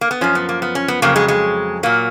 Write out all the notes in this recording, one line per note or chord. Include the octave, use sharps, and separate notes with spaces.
A#3
B3
F#2 F3 C#4
B3
A#3
B3
C#4
B3
F2 C#3 F#3 A#3
G#3
G#3
A#2 F#3 A#3